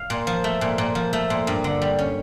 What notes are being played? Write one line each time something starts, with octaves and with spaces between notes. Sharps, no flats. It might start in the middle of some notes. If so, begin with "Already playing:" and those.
Already playing: F5
A#2
F3
A3
A#2
A#2
F3
A3
A#2
G2
D3
G3
C#4